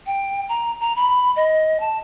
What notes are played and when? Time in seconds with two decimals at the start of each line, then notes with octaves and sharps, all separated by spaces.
0.06 G5
0.49 A#5
0.81 A#5
0.96 B5
1.36 D#5
1.80 A5